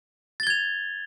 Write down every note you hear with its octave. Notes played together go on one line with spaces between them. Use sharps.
G#6 A6 F7 G7